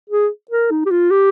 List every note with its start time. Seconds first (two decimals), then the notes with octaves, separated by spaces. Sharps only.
0.10 G#4
0.51 A#4
0.71 D#4
0.85 G4
0.91 F4
1.11 G4